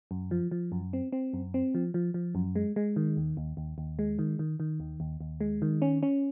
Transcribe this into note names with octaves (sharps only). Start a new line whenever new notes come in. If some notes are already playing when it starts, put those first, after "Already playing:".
F#2
F3
F3
F#2
C4
C4
F#2
C4
F3
F3
F3
F#2
G#3
G#3
D#3
D#2
D#2
D#2
D#2
G#3
D#3
D#3
D#3
D#2
D#2
D#2
G#3
D#3
C#4
C#4